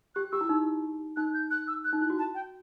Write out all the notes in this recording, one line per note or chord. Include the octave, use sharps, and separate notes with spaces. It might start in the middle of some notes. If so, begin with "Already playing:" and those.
G4 F#6
G4 E6
E4
D#4
D#4 F#6
G6
F#6
E6
F#6
D#4
E4 F#6
F#4
A5
G5